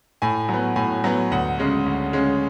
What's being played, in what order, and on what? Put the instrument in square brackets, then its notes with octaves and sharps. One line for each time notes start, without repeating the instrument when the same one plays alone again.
[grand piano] A2 G#5
F#3 B3
A2 G#5
F#3 B3
D2 F#5
C#3 G#3 C#4
D2
C#3 G#3 C#4